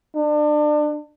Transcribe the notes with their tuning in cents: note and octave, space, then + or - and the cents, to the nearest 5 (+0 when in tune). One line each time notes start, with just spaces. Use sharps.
D4 +30